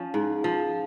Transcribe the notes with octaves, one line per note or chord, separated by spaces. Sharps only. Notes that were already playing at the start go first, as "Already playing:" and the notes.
Already playing: F3 C#4
G#2
F3